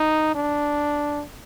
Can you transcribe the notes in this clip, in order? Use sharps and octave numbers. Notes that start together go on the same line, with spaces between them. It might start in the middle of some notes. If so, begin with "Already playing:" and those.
Already playing: D#4
D4